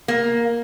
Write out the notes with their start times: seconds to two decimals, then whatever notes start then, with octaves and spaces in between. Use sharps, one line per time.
0.08 A#3